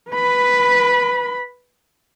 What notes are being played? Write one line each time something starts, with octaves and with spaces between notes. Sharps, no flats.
B4 B5